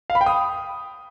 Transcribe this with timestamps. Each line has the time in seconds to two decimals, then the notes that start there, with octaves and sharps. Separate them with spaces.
0.10 F5
0.15 B5
0.21 G5
0.26 D#6